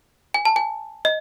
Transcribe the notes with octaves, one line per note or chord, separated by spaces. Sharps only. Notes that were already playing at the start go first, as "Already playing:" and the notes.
G#5
A5
G#5
D#5